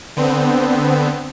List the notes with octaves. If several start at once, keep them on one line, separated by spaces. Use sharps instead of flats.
D3 B3 C4